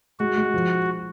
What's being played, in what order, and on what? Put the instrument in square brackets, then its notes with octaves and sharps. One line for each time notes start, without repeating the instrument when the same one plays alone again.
[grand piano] G#3 [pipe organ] F#4
[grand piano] G#3
F3